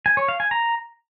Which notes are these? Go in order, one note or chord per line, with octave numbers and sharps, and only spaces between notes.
G#5
C#5
F5
G#5
A#5